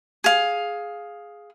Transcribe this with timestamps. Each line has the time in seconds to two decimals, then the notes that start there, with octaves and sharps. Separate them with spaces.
0.24 G#4 F5